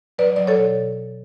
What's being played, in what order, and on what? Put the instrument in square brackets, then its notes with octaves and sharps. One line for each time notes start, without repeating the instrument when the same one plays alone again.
[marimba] F#3 B4 D5
F#3 D5
A4 C#5
B2